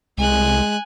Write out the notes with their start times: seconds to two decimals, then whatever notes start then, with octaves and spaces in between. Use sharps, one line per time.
0.18 C2 G#3 G#5 F#6